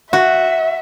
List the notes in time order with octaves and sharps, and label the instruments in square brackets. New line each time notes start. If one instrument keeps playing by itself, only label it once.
[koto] F#4 [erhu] E5